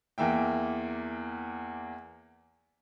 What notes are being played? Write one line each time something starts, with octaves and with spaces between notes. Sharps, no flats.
E2 A#3 E5 G5